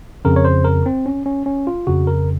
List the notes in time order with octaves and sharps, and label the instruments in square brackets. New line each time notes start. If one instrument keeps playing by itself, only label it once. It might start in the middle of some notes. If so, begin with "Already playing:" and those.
[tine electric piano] F2 C#3 A#4
C#5
C5
A#4
C4
C#4
C#4
C#4
F4
F2 C#3 F#4
A#4